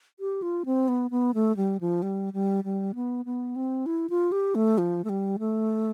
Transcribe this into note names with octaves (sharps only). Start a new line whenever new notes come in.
G4
F4
C4
B3
B3
A3
G3
F3
G3
G3
G3
B3
B3
C4
E4
F4
G4
A3
F3
A3
G3
A3